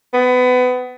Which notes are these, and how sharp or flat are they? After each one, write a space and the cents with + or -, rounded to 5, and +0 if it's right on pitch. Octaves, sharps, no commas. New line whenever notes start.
B3 +25